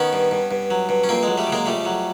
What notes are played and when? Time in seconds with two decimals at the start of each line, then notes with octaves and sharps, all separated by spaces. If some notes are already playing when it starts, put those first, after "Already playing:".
Already playing: D#3 B3 C#4
0.13 G2
0.31 G2
0.51 G2
0.71 F#3
0.89 G2
1.04 C#4
1.09 F2 A#3 C4
1.23 F#3 G#3
1.38 G3 A3
1.47 C#3
1.52 G#3 A#3
1.66 F2 G3 A3
1.85 F#3